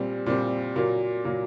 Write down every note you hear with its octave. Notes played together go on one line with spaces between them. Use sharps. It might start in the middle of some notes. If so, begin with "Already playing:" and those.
Already playing: A#2 G3 C4
A#2 G3 C4
A#2 F#3 A#3
A#2 F#3 A#3